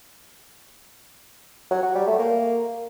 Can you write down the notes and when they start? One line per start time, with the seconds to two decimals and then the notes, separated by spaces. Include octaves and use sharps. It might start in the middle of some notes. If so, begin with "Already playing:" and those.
1.71 F#3
1.83 F#4
1.95 G3
2.07 A3
2.19 A#3